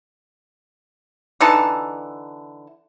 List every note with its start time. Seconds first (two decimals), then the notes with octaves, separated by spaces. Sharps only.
1.41 D3 E3 D#4 A5